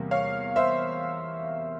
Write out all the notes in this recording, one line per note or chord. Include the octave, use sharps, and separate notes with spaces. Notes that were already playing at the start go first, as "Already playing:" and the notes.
Already playing: E2 C3 G3 A#3
C#5 F5
C5 E5